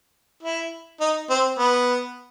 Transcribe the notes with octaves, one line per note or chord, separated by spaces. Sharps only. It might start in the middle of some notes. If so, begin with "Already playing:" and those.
E4
D#4
C4
B3